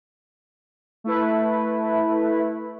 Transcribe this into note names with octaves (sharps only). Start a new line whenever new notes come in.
A3 E4 B4